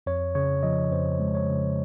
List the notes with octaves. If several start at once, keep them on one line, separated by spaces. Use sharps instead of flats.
F2 C#5
C#3 C#5
F3 D#5
F2 C5
G#3
C#5
C#3